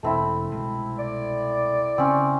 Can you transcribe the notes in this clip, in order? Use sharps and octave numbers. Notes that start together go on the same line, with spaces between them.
E1 A3 C4 E4
C2 B2 G#3
D5
C#3 C4 C#4